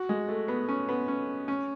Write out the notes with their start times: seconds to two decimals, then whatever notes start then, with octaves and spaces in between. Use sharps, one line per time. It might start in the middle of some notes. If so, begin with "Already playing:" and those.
Already playing: F#4
0.09 G#3
0.29 A3
0.48 B3
0.68 C#4
0.89 B3
1.08 C#4
1.48 C#4